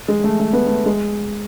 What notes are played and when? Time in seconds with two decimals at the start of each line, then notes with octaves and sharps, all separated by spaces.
0.08 G#3
0.24 A3
0.39 A3
0.53 B3
0.67 A3
0.86 G#3